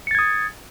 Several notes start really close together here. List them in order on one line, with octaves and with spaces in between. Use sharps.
C#7 A6 G#6 D#6